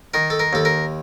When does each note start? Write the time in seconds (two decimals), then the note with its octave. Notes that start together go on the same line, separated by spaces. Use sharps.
0.14 D#3 A#4
0.30 A4
0.40 A#4
0.53 D#2 A4
0.65 A#4